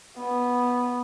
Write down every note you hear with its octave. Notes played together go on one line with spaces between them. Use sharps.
B3